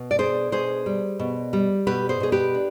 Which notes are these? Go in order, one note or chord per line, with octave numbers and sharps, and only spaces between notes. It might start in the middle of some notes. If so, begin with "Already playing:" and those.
Already playing: B2
D5
D4 G#4 C5
B2 G#4 C5
G3
B2
G3
B2 G4 B4
G#4 C5
B2 G#4
G4 B4
D4